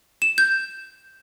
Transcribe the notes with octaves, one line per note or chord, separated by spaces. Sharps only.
E7
G6